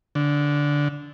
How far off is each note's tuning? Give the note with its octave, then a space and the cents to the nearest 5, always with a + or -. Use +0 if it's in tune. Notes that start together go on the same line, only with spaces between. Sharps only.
D3 -10